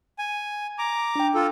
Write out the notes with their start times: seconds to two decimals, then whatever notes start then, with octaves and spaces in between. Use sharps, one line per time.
0.18 G#5
0.78 A#5 D6
1.15 D4 G5
1.35 F4 A4